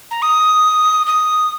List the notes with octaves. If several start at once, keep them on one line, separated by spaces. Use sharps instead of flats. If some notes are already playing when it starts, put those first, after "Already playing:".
A#5
D#6
D#6